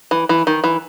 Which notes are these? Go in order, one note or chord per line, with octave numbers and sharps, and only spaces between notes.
E3
E3
D#3
E3